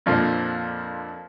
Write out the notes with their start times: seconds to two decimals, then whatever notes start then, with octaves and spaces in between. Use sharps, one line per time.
0.06 F2 A#2 D3 F3